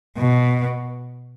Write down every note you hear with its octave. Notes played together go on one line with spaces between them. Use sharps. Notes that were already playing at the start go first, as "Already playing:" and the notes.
B2